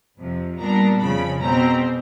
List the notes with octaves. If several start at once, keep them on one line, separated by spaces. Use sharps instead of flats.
F2 C3 F3
A#2 G3 B3 D4 A#5
F2 C#3 F3 B5
B2 G#3 C4 A#5